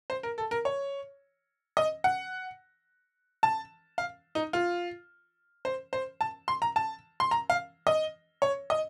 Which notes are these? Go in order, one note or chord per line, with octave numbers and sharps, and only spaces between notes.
C5
A#4
A4
A#4
C#5
D#5
F#5
A5
F5
D#4
F4
C5
C5
A5
C6
A#5
A5
C6
A#5
F5
D#5
C#5
D#5